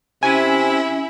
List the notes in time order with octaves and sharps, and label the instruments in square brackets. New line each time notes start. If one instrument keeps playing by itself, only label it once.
[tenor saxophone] C3 [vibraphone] C#4 [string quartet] E4 E5 [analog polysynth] G#5